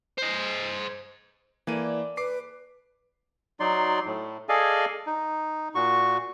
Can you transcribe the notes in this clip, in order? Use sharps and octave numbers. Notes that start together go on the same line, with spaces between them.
C5 D#5
E3 A#3 A4 D5 D#7
B4 D6 C7
F#3 D#4 D5 C6
A2
G#4 A4 D5 D#5 F5 G#5
D#4
A#2 F#4 C#6